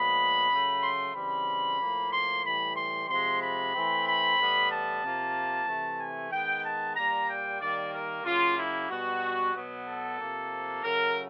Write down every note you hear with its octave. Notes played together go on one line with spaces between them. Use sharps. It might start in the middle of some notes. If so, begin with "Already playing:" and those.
Already playing: A#2 F3 G#3 B3 B5
C#3 F#3 A3
C6
C#3 E3 G3 C4 B5
A2 F3 A#3
C6
A2 E3 G3 B5
C6
C3 F3 G#3 C6
B5
E3 A3 C4
B5
A2 E3 G3 B3
A5
C3 F3 A#3
C3 E3 A3
G#5
D#3 G#3 B3 G5
A5
A#2 G3 A#3 A#5
G5
D#3 G3 A#3 D5
A#4
C#3 F#3 A#3 F4
E4
B2 G3 B3 F#4
B2 F#3 B3
A4
C3 F3 A#3
C#3 F#3 A3 A#4